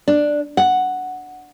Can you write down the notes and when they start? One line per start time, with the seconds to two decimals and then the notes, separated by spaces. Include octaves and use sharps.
0.08 D4
0.57 F#5